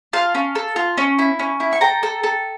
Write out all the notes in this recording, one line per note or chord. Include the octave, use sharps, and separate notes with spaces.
F4 F5 A5
C#4
A4
F4
C#4
E4
C#4
E4
C#6
A4 G5 A#5
A4
A4